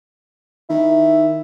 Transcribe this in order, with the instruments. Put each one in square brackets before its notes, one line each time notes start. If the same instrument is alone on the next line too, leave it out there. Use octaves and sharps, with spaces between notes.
[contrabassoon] D#3 [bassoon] E4